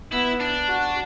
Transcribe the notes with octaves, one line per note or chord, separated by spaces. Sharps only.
B3 E4
D4
F#4